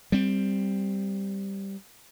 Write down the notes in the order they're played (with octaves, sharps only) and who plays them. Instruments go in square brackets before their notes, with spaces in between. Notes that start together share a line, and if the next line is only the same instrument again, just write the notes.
[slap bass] G3 C4